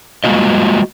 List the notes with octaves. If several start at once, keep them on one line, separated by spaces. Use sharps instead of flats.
G3 G#3 A#3 F4 F#4 D#5